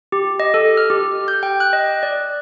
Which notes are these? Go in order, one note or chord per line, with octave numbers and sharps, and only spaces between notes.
G4
D#5
A4
F6
G4
G6
G5
F#6
D#5
D5